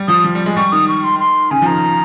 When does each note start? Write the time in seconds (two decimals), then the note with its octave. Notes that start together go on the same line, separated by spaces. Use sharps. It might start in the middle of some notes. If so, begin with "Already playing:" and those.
Already playing: G3
0.08 F3 D#6
0.24 F3
0.35 G3
0.46 G#3
0.56 G3 C#6
0.72 D#3 D#6
0.88 C#6
1.04 C6
1.20 C6
1.51 C#3 G#5
1.62 F3
1.66 D#3 A#5